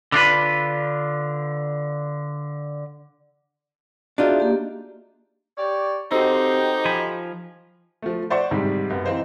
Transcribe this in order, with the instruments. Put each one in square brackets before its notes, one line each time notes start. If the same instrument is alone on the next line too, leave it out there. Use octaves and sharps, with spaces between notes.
[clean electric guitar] D3 D4 F4 B4
[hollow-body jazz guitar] D4 D#4 F4 [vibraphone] F#4 G#4 E5
[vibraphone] A#3 G4
[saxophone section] G4 C#5 D5
[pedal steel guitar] C4 [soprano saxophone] D#4 [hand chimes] F#4 A4 C5 [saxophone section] G4
[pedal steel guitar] F3 G#5 B5
[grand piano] F3 A3
C5 D5 E5 F#5 C6 C#6
G#2 C3 D#3 G3
F#2 B3
E3 C4 D#4 C5 F5